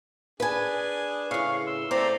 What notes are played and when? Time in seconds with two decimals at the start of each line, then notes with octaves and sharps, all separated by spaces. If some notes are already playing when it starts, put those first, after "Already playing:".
0.40 D4 G#4 B4 G#5
1.31 A2 C#3 F5 C#6
1.67 C6 E6
1.91 A3 C4 C5 D5 A#5 C6